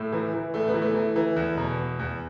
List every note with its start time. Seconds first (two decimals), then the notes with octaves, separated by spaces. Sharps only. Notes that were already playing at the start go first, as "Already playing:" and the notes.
Already playing: A2 A3
0.12 E3
0.34 E3
0.54 A2 A3
0.68 B3
0.74 E3
0.82 A3
0.95 E3
1.16 E3
1.36 E2
1.57 B2
1.78 E2
1.99 E2